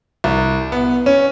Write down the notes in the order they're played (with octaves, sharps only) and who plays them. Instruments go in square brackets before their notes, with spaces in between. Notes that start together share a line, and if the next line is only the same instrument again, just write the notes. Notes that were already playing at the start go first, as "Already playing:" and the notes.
[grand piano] C2
B3
C#4